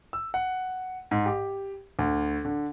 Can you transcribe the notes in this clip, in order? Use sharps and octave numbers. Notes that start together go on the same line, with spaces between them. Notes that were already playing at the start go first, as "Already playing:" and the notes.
E6
F#5
G#2
G4
D2
D3